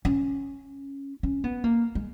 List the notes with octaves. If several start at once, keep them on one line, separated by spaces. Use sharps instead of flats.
C#4
C#4
B3
A#3
G#3